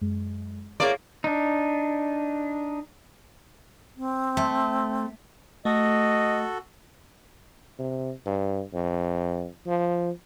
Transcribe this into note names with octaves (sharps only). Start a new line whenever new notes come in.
F#2 G#3
A2 A#3 G#4 D5 C#6
D4 D#4
C4
A3
A3 F#4 A4 D#5
C3
G2
F2
F3